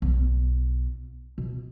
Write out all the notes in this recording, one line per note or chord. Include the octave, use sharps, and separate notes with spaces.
B1 F4
B2